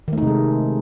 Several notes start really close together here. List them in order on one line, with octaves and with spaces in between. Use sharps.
D#3 A3 D#4 C3 G#3